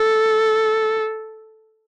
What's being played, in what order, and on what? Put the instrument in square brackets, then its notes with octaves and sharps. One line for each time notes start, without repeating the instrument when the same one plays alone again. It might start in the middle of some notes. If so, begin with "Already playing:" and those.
Already playing: [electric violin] A4